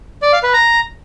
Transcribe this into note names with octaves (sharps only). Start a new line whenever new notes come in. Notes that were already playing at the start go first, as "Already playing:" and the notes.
D5
F5
B4
A#5